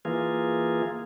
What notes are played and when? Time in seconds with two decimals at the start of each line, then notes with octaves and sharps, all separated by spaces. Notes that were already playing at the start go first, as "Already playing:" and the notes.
0.05 E3 A#3 F4 G#4